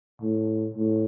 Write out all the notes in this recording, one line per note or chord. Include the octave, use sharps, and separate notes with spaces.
A2
A2